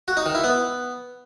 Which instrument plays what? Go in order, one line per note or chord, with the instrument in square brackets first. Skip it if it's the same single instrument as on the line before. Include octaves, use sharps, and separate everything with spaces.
[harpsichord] F#4
D#4
D#3
E4
B3